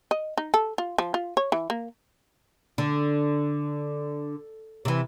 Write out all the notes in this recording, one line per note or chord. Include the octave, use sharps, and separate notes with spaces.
D#5
D#4
A4
F4
F3
F4
C#5
E3
A#3
D3
C3 E3